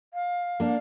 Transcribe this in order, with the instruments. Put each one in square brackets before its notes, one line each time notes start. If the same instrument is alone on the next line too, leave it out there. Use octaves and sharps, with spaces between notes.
[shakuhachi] F5
[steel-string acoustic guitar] A#3 D4